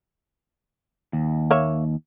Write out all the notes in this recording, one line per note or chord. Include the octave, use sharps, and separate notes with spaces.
D#2
A#3 C#5 E5